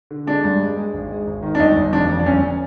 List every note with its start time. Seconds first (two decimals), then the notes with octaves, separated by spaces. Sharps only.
0.11 D3
0.27 G#3 D4
0.44 G2
0.61 G#3
0.77 G#3
0.94 G#1
1.09 G#3
1.27 G#1
1.43 D#3
1.55 D4
1.60 G1 D#4
1.77 G1
1.92 F2 D4
2.09 F2
2.20 D4
2.26 G1 C#4